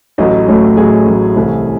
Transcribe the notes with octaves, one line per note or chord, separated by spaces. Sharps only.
A1 A2 F#3 A3 D#5
A1 A2 F#3 A3
A1 A2 F#3 A3 G#4
A1 A2 F#3 A3
C2 C3 E3 A3